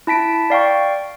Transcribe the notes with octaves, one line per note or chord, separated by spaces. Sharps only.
E4 A5 B6 D7
D5 F5 G5 C#6